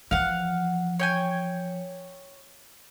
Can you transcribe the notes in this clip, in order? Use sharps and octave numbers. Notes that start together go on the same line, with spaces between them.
E3 F3 F5 F#5
C#5 G5 G#5